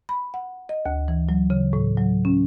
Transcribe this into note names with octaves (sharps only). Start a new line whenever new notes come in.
B5
F#5
D#5
D2
E3
F#3
C#3
A2
F#3
C#4